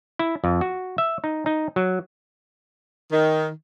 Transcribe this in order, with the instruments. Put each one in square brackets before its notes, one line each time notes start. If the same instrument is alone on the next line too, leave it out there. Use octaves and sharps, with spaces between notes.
[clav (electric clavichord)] E4
F2
F#4
E5
D#4
D#4
F#3
[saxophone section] D#3